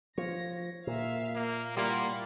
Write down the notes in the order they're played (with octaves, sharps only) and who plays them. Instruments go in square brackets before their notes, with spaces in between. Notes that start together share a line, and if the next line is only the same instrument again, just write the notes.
[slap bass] F3 [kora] C#5 [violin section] A#6
[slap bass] A#2 [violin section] E5 F5
[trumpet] A#3
[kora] G3 E4 F4 [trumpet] A#3 [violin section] D5 F#5